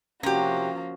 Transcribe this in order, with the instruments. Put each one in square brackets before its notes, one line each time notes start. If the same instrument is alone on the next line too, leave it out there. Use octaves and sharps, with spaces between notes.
[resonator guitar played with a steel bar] C3 G4 [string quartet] F3 A#3 [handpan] C#4 F#4